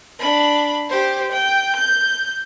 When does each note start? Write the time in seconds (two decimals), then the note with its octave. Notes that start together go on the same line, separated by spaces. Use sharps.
0.19 D4 B5
0.89 G4 C5
1.32 G5
1.76 G6